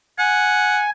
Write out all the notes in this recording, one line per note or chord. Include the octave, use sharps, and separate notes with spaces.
F#5 G#5